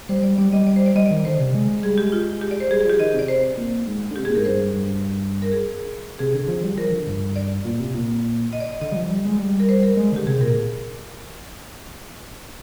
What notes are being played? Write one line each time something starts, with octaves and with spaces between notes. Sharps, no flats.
G3 C5
D5
G3 D5
G3 D#5
D5
C5
D5
G3 D#5
D5
D#3
D3 C5
C3
G#3
G3 G#4
G#3 G4
F4
G4
D5
C5
G3 G#4
G#4
F3 G4
D#3 D#5
C3
D5
C5
A#2
G#2
D3
G4
C3
G#4
A#2
G#2 A#4
G2 C5
G2
A#4
G#4
C3 G#4
D3
F3
G3
F3 A#4
D3
G2
D5
A#2
C3
A#2
D#5
D5
D#5
D3 D#5
G3
F3
G3
G#3
G3
A#4
C5
A#4
G#3
D3 G4
C3 G#4
A#2 A#4